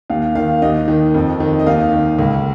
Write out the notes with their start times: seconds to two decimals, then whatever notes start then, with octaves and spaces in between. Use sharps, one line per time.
0.10 D#2 F5
0.35 D#3 F5
0.62 D#2 D#5
0.88 D#3
1.14 F2
1.40 D#3
1.59 D#5
1.66 D#2 F5
1.93 D#3
2.19 C#2